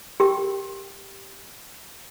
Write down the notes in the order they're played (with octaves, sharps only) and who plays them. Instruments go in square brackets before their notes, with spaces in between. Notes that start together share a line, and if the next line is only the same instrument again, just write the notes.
[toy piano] G4 A#4 G5 C#6